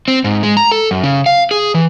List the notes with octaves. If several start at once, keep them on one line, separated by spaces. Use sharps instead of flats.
C4
G#2
G#3
A#5
A4
F#2
C#3
F5
G#4
E3